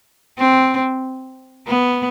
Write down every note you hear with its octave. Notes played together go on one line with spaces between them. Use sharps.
C4
B3